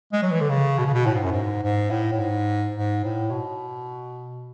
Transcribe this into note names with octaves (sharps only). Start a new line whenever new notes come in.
G#3
F#3
E3
D3
C#3
B2
C#3
B2
A2
G#2
F#2
G#2
G#2
A2
A2
G#2
G#2
A2
B2